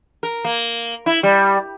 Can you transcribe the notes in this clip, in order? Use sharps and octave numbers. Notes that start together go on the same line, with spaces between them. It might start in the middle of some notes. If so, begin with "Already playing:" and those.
A#4
A#3
E4
G3